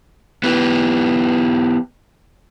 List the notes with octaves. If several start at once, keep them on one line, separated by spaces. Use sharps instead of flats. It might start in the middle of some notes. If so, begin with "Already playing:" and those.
B3 E4 G4